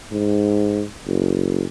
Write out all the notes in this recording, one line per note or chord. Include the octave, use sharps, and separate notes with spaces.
G#2
F#1